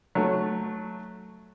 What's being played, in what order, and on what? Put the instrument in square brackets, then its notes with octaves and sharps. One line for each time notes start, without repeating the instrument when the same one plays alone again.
[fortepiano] F#3 A3